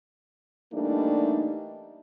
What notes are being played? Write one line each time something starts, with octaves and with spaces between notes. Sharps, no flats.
E3 G3 A3 A#3 D4 D#4